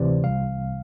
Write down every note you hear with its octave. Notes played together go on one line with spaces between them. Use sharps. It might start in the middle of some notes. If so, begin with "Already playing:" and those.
Already playing: D2 C3 E3 C5 D5
C2 F5